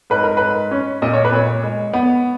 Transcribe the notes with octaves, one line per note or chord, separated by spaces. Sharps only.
G#2 B4
A#4
G#2 B4
C#4
A#2 D#5
C#5
B4
A#2 C#5
G#3
B3